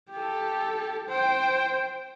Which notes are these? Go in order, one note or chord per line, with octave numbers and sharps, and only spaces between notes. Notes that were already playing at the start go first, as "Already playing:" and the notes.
G4 A4
C5 G5